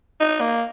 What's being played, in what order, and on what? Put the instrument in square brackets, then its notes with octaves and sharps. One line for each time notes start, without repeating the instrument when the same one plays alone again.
[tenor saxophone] D#4
A#3